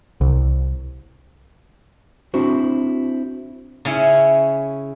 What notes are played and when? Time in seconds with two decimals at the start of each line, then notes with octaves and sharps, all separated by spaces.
0.21 C2
2.34 C4 D4 E4 F#4 C5
3.85 C#3 C#4 E4